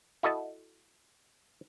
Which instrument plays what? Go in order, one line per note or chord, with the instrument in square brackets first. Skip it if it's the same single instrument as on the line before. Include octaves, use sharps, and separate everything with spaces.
[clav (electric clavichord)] E4 F#4 A4 D#5 A5